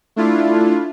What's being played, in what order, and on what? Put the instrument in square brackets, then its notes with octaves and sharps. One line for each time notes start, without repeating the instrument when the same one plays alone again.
[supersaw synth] A3 D4 E4 F4